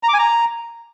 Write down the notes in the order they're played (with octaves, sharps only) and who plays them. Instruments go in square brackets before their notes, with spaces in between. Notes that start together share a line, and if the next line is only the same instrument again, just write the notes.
[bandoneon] A#5
D6
G#5
A#5